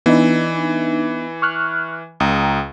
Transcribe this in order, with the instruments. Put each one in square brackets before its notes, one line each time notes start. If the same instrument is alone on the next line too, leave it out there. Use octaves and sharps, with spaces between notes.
[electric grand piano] E3 [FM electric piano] B3 D4 D#4
[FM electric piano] C#6 F6 F#6
[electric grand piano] C#2 [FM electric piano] G5 A#5 D#6